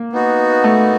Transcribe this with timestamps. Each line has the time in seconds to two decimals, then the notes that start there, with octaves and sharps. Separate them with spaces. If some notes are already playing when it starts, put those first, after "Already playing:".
Already playing: A#3
0.12 B3 D#4 F#4
0.64 A3